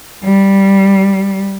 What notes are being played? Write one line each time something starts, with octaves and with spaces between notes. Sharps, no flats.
G3